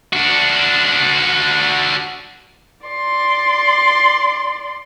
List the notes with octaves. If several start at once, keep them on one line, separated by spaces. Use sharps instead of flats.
D4 F#4
D5 C6